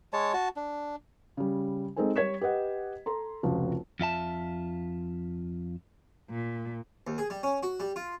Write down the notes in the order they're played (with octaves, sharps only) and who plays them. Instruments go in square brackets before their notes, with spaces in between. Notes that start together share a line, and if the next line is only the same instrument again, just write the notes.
[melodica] G#3 C#5 A5
F#4 A5
D4
[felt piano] C#3 G3
G#3 C4 D#4 A4 C5 G#5
G3 C#5 G#6 B6 E7
G4 B4 D#5 F#5
A4 A#5 C6
F1 C#2 F3 F#4
[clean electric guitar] F2 F4 E5 A5
[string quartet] A#2
[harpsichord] D#2
G#4
G3
C#4
F#4
G3
F4